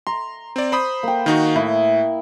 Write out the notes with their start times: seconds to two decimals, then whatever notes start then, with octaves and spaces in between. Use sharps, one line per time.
0.07 A#5 C6
0.56 C4 D5
0.72 C5 B5 D#6
1.03 A#3 G5
1.26 D#3 D#4 F#4
1.56 A2 E4